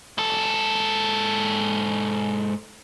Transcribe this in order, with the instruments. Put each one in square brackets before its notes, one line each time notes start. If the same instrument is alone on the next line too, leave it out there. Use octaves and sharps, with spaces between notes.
[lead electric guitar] G#2 A4